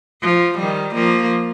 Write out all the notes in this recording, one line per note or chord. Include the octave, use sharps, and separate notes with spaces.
F3
D#3 G3
F3 A#3